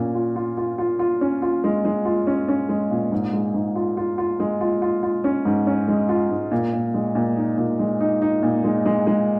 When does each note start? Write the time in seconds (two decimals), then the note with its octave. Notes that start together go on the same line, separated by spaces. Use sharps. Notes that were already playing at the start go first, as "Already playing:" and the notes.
Already playing: A#2 C#4
0.15 F4
0.36 F4
0.57 F4
0.78 F4
0.99 F4
1.21 C#4
1.42 F4
1.64 G#3
1.85 G#3
2.05 F4
2.27 C#4
2.48 C#4
2.69 G#3
2.91 A#2
3.12 G#2
3.33 G#3
3.54 G#2
3.76 F4
3.97 F4
4.18 F4
4.40 G#3
4.61 F4
4.82 F4
5.03 F4
5.24 C#4
5.45 G#2
5.67 C#4
5.88 G#3
6.09 F4
6.30 G#2
6.51 A#2
6.73 A#2
6.94 G#3
7.15 A#2
7.37 D#4
7.57 A#2
7.79 G#3
8.00 D#4
8.22 D#4
8.43 A#2
8.64 G#3
8.86 G#3
9.07 G#3